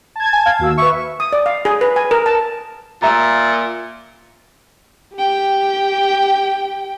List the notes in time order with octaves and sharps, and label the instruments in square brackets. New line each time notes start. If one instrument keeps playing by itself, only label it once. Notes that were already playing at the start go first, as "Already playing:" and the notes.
[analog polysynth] A5 G#6
[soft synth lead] G#5
F5
[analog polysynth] D#2 F#4 E6
[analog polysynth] B4 E5 [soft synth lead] C#6
[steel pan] D#6
D5
F5
G#4
B4
G#5
A#4
A5
[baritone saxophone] A#2 [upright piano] E5 A#5
[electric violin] G4 G5